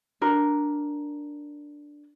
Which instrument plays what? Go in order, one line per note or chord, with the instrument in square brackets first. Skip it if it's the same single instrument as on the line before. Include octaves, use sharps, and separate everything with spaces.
[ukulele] D4 A#4